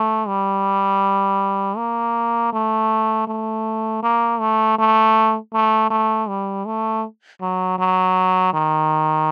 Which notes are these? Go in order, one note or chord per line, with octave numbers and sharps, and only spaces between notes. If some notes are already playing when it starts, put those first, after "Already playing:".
Already playing: A3
G3
A#3
A3
A3
A#3
A3
A3
A3
A3
G3
A3
F#3
F#3
D#3